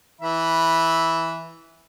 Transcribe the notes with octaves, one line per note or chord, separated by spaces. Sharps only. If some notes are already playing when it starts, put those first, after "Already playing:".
E3 E5 B5